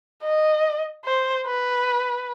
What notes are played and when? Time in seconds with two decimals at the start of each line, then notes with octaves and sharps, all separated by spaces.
0.23 D#5
1.05 C5
1.46 B4